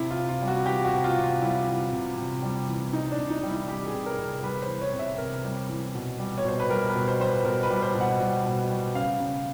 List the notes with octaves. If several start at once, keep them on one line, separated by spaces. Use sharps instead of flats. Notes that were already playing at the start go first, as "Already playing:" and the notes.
Already playing: C3 E4
F4
C3
F4
G3
F#4
E3 G4
F#4
C3
F4
C3
F4
G3 E4
E3
C3
C3
G3
E3
C3 D#4
D4
C3
D#4
G3
E4
E3 G4
G#4
C3
A#4
C3
G3 B4
C5
E3
C#5
C3
E5
C3 A#4
G3
E3
B2
G3
C#5
B2 C5
B4
G3 A#4
B4
B2
C5
G3 C5
B4
B2 A#4
B4
G3
C5
B2
F#5
G3
B2
G3
C#3 F5
C#3